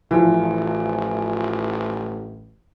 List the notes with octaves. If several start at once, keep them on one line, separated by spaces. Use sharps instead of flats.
A1 E3 F3